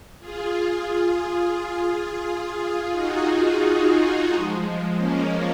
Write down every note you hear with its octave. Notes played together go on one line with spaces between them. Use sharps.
F4 G#4
D#4 F#4
F3 G#3
A#3 C#4